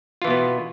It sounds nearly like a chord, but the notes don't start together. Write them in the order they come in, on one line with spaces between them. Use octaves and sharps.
F4 E3 B2 B3